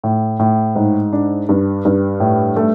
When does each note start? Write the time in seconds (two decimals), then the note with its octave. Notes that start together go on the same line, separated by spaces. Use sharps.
0.04 A2
0.39 A2
0.75 G#2
1.13 D4
1.49 G2
1.85 G2
2.20 A2
2.57 A3